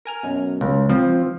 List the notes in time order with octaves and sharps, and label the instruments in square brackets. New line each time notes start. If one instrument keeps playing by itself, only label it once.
[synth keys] A#4 G#5 F6
F#2 B2
[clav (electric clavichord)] C#2
[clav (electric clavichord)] F3 [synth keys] C4